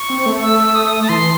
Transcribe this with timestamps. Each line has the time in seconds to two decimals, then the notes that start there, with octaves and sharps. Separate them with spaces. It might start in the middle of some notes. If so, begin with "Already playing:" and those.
Already playing: C#6
0.10 C4
0.26 A3
0.43 E6
0.67 E6
0.75 D#6
1.02 A5
1.09 E3 C6